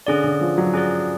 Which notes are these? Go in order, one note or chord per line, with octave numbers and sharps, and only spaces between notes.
D3 C#4 G#4 D5
D3
F3
F#3
C#4 G#4 D5